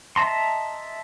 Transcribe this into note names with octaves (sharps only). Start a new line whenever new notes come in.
D#5 E5 A5 A#5 C6